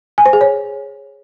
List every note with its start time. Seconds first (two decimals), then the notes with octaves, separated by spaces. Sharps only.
0.18 G#5
0.26 C5
0.33 G#4
0.41 C#5